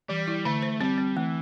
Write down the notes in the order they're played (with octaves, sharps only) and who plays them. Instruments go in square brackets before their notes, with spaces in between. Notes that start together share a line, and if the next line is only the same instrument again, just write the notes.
[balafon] E3 [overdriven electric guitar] G3
[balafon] E4
[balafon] D3 [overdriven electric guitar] A3
[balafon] C5
[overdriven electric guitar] G3 [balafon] C4
[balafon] C4
[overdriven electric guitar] E3 [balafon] A3